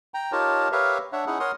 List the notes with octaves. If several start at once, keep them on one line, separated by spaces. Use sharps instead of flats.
G5 A#5
D#4 F4 G4 A#4 C#5 A5
G4 A#4 B4 C#5 E5 F5
D4 C#5 E5 F#5
C#4 D#4 E4 G#4 F#5
A#4 C#5 F#5 C6 D#6